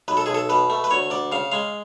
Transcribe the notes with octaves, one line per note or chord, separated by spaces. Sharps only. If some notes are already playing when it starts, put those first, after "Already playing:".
B1 B4
A4
B1 G#4
A4
B2 B4
A3
B4
D2 C#5
D2 D5
C#3 F5
G#3 F5